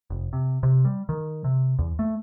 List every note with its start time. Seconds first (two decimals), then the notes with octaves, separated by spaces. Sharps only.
0.10 F1
0.33 C3
0.63 C3
0.85 G3
1.09 D#3
1.44 C3
1.79 E2
1.99 A3